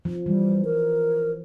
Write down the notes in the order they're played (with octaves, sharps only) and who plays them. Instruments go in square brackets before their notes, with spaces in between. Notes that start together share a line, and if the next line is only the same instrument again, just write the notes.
[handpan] F3
[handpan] E3 [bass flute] G3
[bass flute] A#4